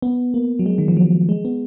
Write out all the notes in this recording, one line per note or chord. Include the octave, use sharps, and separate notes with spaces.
B3
A#3
F#3
G#3
D#3
F3
F#3
G#3
B3